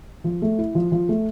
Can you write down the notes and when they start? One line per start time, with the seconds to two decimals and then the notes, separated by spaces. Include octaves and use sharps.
0.24 F3
0.42 A3
0.58 E4
0.75 F3
0.92 F3
1.09 A3